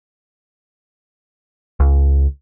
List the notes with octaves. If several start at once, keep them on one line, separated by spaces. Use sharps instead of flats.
C#2